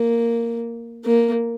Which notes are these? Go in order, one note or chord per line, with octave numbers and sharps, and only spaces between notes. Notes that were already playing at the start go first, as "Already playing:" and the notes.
Already playing: A#3
A#3